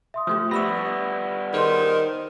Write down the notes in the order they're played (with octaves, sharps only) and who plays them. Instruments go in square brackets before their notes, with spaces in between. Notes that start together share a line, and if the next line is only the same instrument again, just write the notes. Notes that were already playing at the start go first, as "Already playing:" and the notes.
[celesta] E5 C6 D#6
[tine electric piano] F3 A3 G4 [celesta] D#6
[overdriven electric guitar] G3 B3 [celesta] E5 B5 [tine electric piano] C#6 E6 A#6
[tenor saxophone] D#3 [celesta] G#4 C6 [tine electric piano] A#4 C5